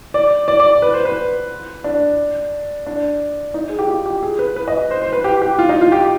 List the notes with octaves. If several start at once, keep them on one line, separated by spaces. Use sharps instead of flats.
D5
D5
D5
B4
C5
B4
D4
D4
D#4
G#4
G4
F4
G4
G#4
B4
B4
D#5
C5
C5
B4
G4
G4
F4
D#4
F4
G4